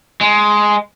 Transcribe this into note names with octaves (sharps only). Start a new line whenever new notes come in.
G#3